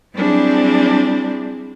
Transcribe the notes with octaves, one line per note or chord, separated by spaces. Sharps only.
F#3 G3 C4 D4 E4 G#4